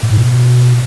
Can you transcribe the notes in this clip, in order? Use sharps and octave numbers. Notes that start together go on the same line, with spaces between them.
A2
G#2
B2